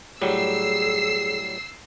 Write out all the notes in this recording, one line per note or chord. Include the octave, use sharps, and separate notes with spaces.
A2 F#3 G3 G#4 E6 C7